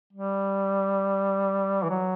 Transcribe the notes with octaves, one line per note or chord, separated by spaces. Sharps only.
G3
E3
F#3